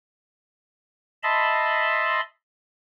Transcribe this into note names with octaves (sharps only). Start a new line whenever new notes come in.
D#5 E5 A5 B5 C6